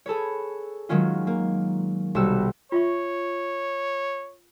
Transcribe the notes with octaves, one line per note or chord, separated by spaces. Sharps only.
G#4 A4 B4 C#5
D#3 F#3 G#3 C#4 F4
A#3
B1 C3 G3 F#4 E6 E7
F4 C#5 E5 C#6